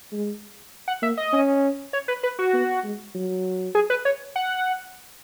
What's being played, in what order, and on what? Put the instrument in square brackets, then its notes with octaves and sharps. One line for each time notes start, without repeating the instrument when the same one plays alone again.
[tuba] G#3
[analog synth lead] F#5
[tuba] A#3 [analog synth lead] E5
[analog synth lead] D#5
[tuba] C#4
[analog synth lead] C#5
B4
B4
F#4
[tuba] B3
G#3
F#3
[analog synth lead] G#4
B4
C#5
F#5